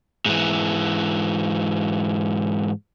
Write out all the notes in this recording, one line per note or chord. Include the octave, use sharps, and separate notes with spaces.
G#2 E3